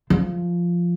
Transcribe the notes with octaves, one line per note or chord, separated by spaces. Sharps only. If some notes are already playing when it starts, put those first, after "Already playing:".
F3